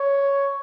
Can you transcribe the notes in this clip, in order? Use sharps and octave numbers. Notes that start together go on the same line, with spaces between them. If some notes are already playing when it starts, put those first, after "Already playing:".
Already playing: C#5